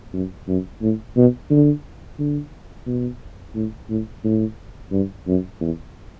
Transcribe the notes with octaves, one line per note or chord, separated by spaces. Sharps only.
F#2
F#2
A2
B2
D3
D3
B2
A2
A2
A2
G2
F#2
E2